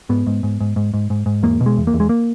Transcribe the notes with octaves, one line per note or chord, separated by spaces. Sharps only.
G#2 B3
G#2
G#2
G#2
G#2
G#2
G#2
G#2
E2 A#3
B2
G#3
E2
A#3
E2
G#3
A#3